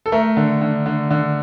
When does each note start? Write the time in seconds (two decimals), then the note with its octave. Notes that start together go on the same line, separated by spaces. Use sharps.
0.06 A4
0.12 A3 A#4
0.37 D3
0.61 D3
0.86 D3
1.10 D3